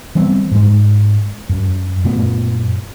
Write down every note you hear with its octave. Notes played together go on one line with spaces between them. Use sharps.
E3 G3 B3 C4
G#2 G#3
F#2
F#2 A#2 A3 B3